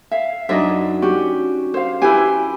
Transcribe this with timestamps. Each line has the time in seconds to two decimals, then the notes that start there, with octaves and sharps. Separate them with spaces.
0.11 E5 F5
0.49 F#2 D4 D#4 D#5 E5
1.02 C#4 F#4 G4
1.74 C5 F5
2.02 E4 G4 B4 G#5